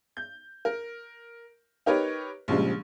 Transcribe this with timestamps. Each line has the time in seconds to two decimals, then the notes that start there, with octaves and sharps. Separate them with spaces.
0.17 G6
0.65 A#4
1.86 D#4 G4 A#4 B4 C#5
2.48 A#1 C#3 F3 G3 G#3